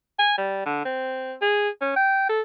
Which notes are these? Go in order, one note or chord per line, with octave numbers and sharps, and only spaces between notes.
G#5
G3
D3
C4
G#4
C#4
G5
A4